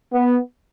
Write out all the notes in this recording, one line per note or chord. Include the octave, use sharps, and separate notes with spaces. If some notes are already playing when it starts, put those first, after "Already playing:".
B3